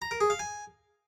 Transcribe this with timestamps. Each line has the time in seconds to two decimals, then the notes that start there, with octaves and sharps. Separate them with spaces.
0.02 A#5
0.11 A#4
0.21 G#4
0.30 F5
0.39 G#5